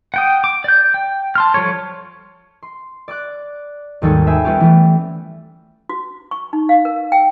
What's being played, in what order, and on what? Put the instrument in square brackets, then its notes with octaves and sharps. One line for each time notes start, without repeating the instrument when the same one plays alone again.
[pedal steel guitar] F#5 G5 D#6
D6
D5 G6
G5
A5 C6 F6
F3 G3 A4 C#5
[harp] C6
D5 D6 F#6
G#1 D#2 G3 A4 C#5
C5 E5 G5 G#5 B5
G3 B3 C#4 F4 G4
E3 G3 A3
[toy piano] F#4
C#6
D#4
F5
A#4
G5